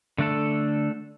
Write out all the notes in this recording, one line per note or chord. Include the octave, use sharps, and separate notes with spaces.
D3 A3 D4 A4